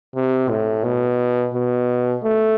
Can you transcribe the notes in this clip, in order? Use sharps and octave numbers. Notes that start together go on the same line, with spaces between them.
C3
A2
B2
B2
A3